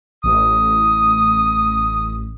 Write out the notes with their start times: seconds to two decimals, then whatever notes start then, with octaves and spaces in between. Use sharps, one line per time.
0.24 A1 D#6